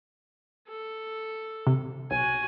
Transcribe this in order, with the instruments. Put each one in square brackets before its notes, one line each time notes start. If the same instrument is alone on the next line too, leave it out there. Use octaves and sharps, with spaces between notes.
[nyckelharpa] A4
[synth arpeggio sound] C3
[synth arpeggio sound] B1 [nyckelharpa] F#4 G#5